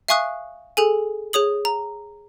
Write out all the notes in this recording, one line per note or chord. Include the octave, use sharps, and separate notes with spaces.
E5 F5 G#5 C#6 D#6 F#6
G#4 A4 G#5
G#4 C#5 D#6 F#7
A#5